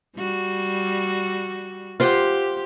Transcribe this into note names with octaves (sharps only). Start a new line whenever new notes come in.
G3 F#4
F4 G4 C5 F#5